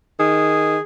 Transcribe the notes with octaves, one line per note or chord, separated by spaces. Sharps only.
D#3 G#4